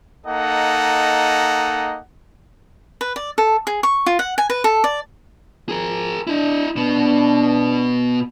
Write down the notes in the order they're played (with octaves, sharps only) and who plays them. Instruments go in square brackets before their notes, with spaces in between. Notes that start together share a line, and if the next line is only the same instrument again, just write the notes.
[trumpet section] A#3 D#4 A4 D#5 F#5
[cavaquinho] B4
D5
A4
G#4
C#6
F4
F#5
G#5
B4
A4
D5
[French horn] F3 [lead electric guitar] G#4 A#4
[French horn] D4 [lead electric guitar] E4 D#5
[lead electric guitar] B2 B3 [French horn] D4